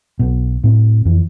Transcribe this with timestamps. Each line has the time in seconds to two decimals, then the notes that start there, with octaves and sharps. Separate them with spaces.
0.19 B1 B2
0.64 A2 C4
1.05 F2 E3